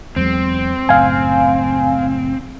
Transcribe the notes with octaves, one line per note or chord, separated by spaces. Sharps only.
E2 F#3 G#3 C4
F#1 F#2 A2 F5 G#5